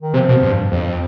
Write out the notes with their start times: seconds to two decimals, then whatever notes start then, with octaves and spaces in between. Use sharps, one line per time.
0.02 D#3
0.14 C3 F3
0.29 B2
0.43 G2
0.72 F2